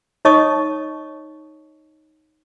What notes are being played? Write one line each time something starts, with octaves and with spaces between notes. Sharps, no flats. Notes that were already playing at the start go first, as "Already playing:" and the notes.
D#4 C#5 D#5 A5 C#6 D#6